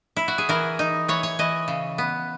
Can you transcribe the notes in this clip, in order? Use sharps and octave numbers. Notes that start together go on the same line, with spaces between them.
E4
F#4
G#4
E3 A#4
D#4
E3 C#5
C#5
E3 D#5
C#3
B3